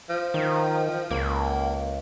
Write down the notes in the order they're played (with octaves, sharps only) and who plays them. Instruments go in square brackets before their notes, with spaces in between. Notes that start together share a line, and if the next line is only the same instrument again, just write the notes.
[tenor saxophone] F3
[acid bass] D#3
[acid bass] C#2 [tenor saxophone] A#3